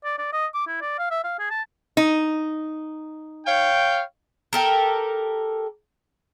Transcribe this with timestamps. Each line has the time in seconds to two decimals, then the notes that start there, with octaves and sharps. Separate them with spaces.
0.04 D5
0.18 D5
0.32 D#5
0.54 D6
0.67 E4
0.81 D5
0.98 F5
1.11 E5
1.24 F5
1.39 G#4
1.50 A5
1.97 D#4
3.46 C#5 F5 G5
4.53 G4 A4 A#4